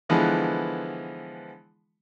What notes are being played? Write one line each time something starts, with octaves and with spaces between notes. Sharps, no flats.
D3 E3 F3 G#3 B3